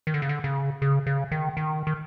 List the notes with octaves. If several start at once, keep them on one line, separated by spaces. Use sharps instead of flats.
D#3
D3
C#3
D3
C#3
C#3
C#3
D#3
D#3
D#3